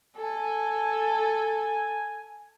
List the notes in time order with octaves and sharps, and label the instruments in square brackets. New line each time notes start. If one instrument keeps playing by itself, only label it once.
[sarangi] A4 [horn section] G#5